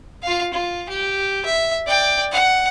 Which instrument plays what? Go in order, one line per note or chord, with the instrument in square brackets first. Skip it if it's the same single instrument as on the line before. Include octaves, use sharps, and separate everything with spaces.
[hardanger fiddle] F4 F5
F4
G4
E5
D5 G5
F#5